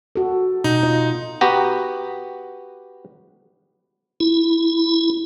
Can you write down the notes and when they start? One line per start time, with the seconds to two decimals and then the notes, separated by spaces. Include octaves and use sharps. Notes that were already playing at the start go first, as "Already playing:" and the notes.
0.16 F#4 A4
0.64 B2 D#4
0.83 F4 D#5
1.41 B3 F#4 G4 A#5
4.20 E4